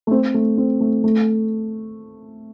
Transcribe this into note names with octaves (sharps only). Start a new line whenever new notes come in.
A3
C4
A3
C4
A3
A3